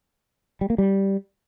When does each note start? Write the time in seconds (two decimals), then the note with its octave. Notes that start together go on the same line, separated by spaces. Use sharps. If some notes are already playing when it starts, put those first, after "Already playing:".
0.61 G3
0.70 A#3
0.78 G3